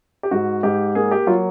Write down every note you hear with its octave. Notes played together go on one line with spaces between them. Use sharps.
G4
G#2 F#4
G#2 G4
A#3 G#4
G4
F#3 F4